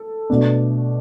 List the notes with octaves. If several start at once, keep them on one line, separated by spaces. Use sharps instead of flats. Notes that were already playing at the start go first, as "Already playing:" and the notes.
Already playing: A4
B2 A3 D4